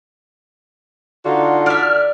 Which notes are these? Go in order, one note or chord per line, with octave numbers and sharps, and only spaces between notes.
D3 D#4 F4 F#4
D5 E5 F6